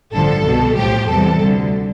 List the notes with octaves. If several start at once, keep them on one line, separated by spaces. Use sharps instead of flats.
A1 G2 D3 F3 A4
C2 B2 G3
B1 A2 F3 G4
E2 C3 E3 G3 A4
D2 D3 G3